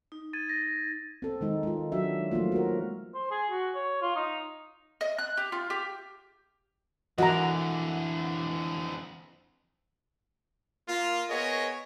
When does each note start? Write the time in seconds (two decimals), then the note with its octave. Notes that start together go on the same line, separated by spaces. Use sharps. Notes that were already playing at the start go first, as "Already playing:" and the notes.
0.12 D#4
0.33 G#6 A6 D#7
0.49 A#6
1.22 C4 A4
1.41 D#3 G#3 D#4
1.63 G#3 F4
1.92 F#3 D4 F#4 E5
2.31 F3 F#3 A3 A#3 F4
2.52 F#4 A#4
3.14 C5
3.31 G#4
3.50 F#4
3.75 C#5
4.02 F4
4.16 D#4
5.01 D#5
5.18 F#6
5.37 G4
5.52 F4
5.70 G4
7.18 F2 D3 E3 F#4 A4 A#4 D#5 A#5
10.88 A#3 F4
11.29 B3 G#4 A#4 C#5 D#5